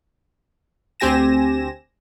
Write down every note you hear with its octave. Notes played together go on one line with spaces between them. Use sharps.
D2 C4 G4 G#5 A#6 E7